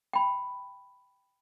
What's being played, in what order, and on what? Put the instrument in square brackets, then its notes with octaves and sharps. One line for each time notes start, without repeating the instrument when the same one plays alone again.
[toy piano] G5 B5